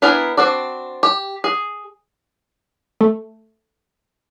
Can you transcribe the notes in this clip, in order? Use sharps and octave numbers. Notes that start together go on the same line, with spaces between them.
B3 D4 E4 A#4 G#5
C4 D4 F#4 D5
G4
G#4
A3